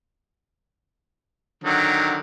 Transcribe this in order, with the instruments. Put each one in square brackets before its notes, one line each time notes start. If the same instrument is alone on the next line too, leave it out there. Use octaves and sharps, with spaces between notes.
[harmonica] D3 D#3 F#3